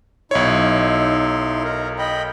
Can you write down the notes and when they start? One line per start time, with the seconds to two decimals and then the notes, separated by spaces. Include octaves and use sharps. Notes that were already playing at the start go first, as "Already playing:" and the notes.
0.31 B1 D#4 E4 C#5 C6
1.64 A#4
1.98 D#5 G5 B5